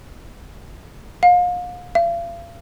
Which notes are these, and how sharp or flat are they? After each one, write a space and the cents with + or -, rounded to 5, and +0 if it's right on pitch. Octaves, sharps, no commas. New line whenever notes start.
F5 +35
F5 -40